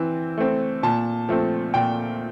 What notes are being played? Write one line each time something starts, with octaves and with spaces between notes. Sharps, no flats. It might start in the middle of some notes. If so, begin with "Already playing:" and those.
Already playing: E3 C4
A3 C4
A#2 A5
F3 A3 C4
A#2 G5